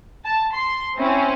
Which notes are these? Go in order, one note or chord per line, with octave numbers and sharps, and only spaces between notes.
A5
C6
C4 C#4 E4